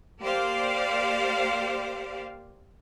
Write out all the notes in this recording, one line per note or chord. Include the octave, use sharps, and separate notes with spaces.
A#3 G4 C5 D5 F5